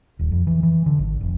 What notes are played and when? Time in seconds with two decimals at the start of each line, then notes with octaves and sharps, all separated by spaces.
0.19 D#1
0.32 F2
0.47 E3
0.63 E3
0.86 D3
0.99 G#1
1.21 F1